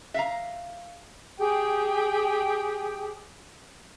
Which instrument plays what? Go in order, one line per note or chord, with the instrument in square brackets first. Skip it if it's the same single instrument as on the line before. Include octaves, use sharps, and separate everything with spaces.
[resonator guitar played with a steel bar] E5 F5 A#5
[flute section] G4 G#4 G5